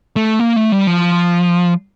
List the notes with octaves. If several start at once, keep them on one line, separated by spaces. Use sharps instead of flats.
A3
A#3
A3
G3
F3